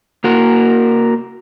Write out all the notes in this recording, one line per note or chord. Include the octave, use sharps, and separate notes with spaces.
A#3 F#4 A#4